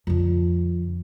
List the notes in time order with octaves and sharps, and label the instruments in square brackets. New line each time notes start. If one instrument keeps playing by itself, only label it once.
[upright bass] F2 D3